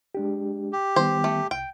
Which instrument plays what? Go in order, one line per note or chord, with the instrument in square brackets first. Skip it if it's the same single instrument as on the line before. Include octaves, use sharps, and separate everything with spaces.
[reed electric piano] G#3 D4 G4
[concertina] G4
[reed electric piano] D#3 G3 B3 [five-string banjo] C5
[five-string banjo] A3
[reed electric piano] C2 [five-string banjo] G5